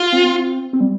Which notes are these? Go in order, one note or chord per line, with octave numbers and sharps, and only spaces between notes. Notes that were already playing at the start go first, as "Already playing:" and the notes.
Already playing: F4
C4
C4
C4
G3